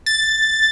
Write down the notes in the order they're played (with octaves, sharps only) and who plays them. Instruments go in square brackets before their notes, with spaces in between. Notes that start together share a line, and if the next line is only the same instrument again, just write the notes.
[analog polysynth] A6